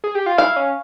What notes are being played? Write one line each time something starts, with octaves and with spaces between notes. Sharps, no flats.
G#4
G4
F4
E4 F5
C#4